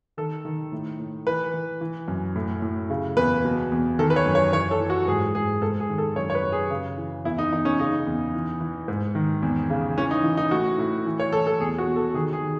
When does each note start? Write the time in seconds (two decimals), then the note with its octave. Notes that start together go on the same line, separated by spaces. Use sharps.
0.17 D#3 A4
0.45 D#3
0.72 A2
1.00 A2
1.26 E3 B4
1.53 E3
1.81 E3
2.08 F#2
2.35 A2
2.62 A2
2.90 C#3
3.17 E2 B4
3.45 B2
3.72 E2
3.99 D#3 A4
4.10 B4
4.16 C#5
4.26 F#2
4.35 C#5
4.53 E3 C#5
4.71 A4
4.80 E3
4.90 F#4
5.07 G#2 G#4
5.35 G#2 G#4
5.62 G#2 A4
5.80 G#4
5.89 D#3
5.98 A4
6.16 F#2 C#5
6.30 C#5
6.35 B4
6.43 F#2
6.52 G#4
6.70 C#3
6.97 E3
7.25 E2 E4
7.38 D#4
7.52 E2 D#4
7.65 C#4
7.79 C#3 D#4
8.07 E2
8.34 E3
8.61 E3
8.88 G#2
9.15 D#3
9.42 E2
9.70 C#3
9.97 E3 C#4
10.11 D#4
10.24 E3
10.37 D#4
10.51 A2 F#4
10.79 A2
11.06 E3
11.20 C#5
11.32 E3 A4
11.47 A4
11.60 E2 G#4
11.78 F#4
11.87 B2
11.96 A4
12.14 D#3 G#4
12.33 G#4
12.42 D#3